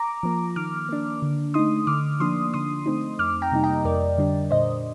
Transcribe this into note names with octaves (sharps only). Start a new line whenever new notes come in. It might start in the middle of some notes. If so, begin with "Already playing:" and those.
Already playing: A#5 D6
F3 A#3
D#3 D6 F6
A#3 D4
D3
A3 D#4 C6 D#6
D3 D6 F6
F3 A#3 D4 C6 D#6
D3 C6 D#6
A3 C4 D#4
F2 D6 F6
G5 A#5
C3 G3 A#3 D#4
D#5 G5
F2 A#4 D5
D3 G3 D4
A#2 C5 D#5